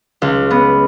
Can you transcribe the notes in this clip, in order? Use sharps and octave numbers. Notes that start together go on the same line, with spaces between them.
C#2
B3